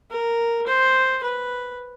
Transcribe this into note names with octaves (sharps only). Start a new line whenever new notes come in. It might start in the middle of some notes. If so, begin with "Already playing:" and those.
A#4
C5
B4